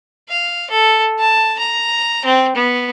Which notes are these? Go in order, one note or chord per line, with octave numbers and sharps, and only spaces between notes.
F5
A4
A5
A#5
C4
B3